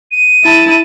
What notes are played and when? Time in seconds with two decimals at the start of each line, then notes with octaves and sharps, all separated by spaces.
0.11 D#7
0.44 E4 A5